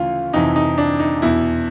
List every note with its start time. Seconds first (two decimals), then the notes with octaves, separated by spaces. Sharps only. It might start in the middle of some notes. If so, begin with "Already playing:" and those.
Already playing: D2 C#3 E3 F4
0.33 F2 C3 E3 D#4
0.56 D#4
0.78 D4
1.00 D#4
1.22 E2 B2 E4